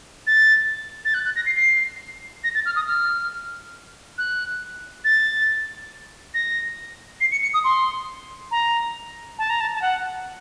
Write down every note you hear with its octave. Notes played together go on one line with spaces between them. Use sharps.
A6
A6
F#6
F#6
A#6
C7
C7
A#6
A6
F6
D#6
F6
F#6
A6
A#6
C7
C#7
C#7
D#6
C6
A#5
A5
A#5
A5
A5
F#5